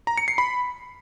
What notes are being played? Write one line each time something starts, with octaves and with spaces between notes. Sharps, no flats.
A#5
C#7
C7
B5